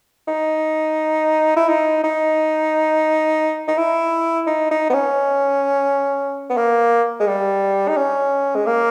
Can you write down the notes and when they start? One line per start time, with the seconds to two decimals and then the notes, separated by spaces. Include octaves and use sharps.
0.28 D#4
1.56 E4
1.68 D#4
2.03 D#4
3.68 D#4
3.78 E4
4.47 D#4
4.71 D#4
4.90 B3
4.94 C#4
6.50 B3
6.57 A#3
7.20 G#3
7.27 G3
7.88 D#4
7.97 C#4
8.55 G#3
8.66 A#3